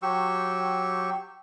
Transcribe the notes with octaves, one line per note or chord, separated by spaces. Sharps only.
F#3 G4 C#6 E6